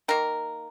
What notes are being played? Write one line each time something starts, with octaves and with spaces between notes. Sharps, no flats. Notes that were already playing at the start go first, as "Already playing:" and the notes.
D#3 A#3 A#4